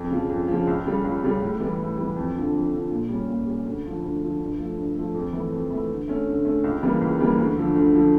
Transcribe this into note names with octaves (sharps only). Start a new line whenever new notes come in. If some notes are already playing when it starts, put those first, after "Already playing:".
Already playing: F2
C#3 F3
F2
C#3 F3
C#2
C#3 G3 C#4
C#2
C#3 G3 C#4
A2
E3 G3
A2
E3 G3
F2
D3 F3
F2
D3 F3
A#2
G3 C#4
A#2
G3 C#4
D2
D3 F3
D2
D3 F3
G2
F3 A3
G2
F3 A3
F2
E3 A3
F2
E3 A3
D3
A3 C#4
D3
A3 C#4
C#2
C#3 E3 G3 A#3
C#2
C#3 E3 G3 A#3
D2
D3 F3
D2
D3 F3